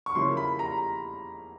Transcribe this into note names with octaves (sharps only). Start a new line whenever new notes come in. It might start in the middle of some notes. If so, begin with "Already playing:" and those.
C#6
C#3 F3 A#3 C#4 E4 C6
B5
A#5